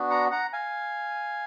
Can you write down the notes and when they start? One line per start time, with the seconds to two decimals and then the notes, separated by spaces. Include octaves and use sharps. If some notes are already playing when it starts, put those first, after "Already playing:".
Already playing: B3 D4 F#4
0.10 F#5 A#5
0.31 F#5 A#5
0.53 F5 G#5